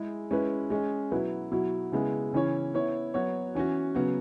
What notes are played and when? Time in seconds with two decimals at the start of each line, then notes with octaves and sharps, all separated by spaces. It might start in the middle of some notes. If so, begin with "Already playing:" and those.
Already playing: G#3 E4 G#4
0.31 G#3 C#4 E4 B4
0.70 G#3 C#4 G#4
1.11 B2 F#3 E4 B4
1.52 B2 F#3 E4
1.92 C#3 G#3 B3 E4 G#4
2.33 C#3 E3 C#4 E4 C#5
2.74 B3 E4 C#5
3.14 F#3 B3 F#4 C#5
3.55 E3 C#4 F#4
3.95 C#3 F#3 B3 F#4